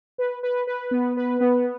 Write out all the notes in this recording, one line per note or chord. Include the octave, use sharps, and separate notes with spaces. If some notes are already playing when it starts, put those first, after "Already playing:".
B4
B4
B4
B3
B4
B3